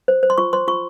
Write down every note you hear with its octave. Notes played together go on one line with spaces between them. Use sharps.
C5
C5
C6
F4 C#6
C5 C6
F4 C#6